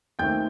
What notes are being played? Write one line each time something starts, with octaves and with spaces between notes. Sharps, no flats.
D#2 D#3 A3 C4 G5 G6